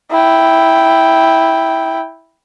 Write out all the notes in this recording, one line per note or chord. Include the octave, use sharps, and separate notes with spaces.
E4 G5